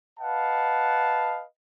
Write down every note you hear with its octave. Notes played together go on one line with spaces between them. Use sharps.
B4 D#5 F5 F#5 A5